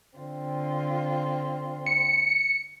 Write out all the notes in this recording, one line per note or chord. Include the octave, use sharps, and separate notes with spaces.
D3 C4 F4
C#7